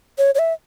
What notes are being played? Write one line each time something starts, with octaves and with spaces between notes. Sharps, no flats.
C#5
C#5
E5